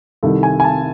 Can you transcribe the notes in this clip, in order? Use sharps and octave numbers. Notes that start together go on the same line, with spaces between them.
C2 C3 D#3 A4
G#5
G#5
A5